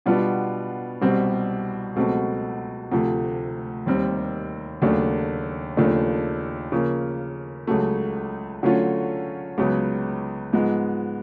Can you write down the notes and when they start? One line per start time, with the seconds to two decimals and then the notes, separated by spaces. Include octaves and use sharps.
0.06 B2 G3 B3 D4 F4
1.01 C2 B2 G3 C4
1.96 C#2 B2 F#3 A3 C4
2.92 D2 C3 F3 A3
3.86 D#2 D#3 G3 C4
4.82 D#2 C#3 F#3 A3 D4
5.77 D#2 C#3 F3 A3 D4
6.72 C#3 F3 A#3
7.67 C#2 C#3 F#3 A3
8.63 D3 F#3 A3 C#4 F4
9.58 C#2 C#3 F#3 B3
10.53 G#2 F3 G#3 B3